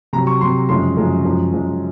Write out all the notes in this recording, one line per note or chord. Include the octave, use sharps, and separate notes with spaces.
C3 F#3 A#5
C#6
C3 F#3 C6
F#2 C#3 F3 G#3 C6
F#2 C#3 F3 G#3
F#2 F3 G#3
F#2 F3 G#3